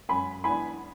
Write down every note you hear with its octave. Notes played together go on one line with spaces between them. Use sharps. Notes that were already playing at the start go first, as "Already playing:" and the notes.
F#2 G#5 B5
E3 B3 D4 G#5 B5